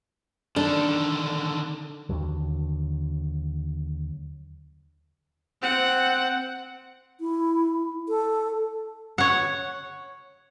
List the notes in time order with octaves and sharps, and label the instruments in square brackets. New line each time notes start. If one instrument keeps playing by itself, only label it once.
[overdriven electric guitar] D3 D#3 [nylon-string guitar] D4 [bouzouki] A4
[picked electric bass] D#2 D3 F#3
[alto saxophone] C4 [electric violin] F#5
[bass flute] E4
A4
[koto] C#5 F#5